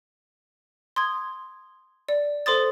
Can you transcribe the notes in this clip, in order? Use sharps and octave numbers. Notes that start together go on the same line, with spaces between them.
C6 D#6 G#6
D5
A4 C5 C6 D#6 A6